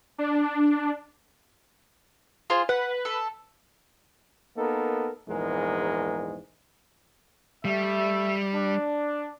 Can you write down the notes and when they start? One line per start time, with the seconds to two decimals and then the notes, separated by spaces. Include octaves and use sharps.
0.18 D4
2.50 F4 G#4 C5
2.69 B4 F#5
3.05 A4
4.56 A#3 B3 D#4 A4 A#4
5.28 A#1 E2 G#2 G#3 A#4
7.65 G3 A3 E5
8.53 D4